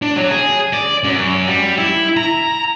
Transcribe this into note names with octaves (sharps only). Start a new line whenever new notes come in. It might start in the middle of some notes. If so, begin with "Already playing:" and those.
D4
F#3
G#4
D5
F#2
G3
E4
A#5